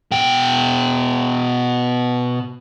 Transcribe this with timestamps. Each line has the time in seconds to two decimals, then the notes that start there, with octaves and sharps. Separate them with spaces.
0.11 B2 G5